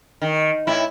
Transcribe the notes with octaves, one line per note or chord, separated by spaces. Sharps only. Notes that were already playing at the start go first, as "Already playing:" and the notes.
D#3
A2 E4